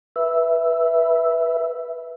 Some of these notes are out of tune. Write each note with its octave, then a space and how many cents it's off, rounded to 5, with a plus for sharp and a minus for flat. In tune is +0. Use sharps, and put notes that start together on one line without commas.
B4 -10 E5 +0